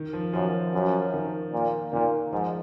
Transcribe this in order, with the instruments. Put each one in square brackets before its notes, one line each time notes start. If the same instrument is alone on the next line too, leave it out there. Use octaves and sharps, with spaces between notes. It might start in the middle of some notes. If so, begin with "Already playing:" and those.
Already playing: [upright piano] D#3
F3
[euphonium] F#2 [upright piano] F3
[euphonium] F#2
[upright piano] D#3
[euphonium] A#2
[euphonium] A#2 [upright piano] D#3
[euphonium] G#2 [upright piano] F3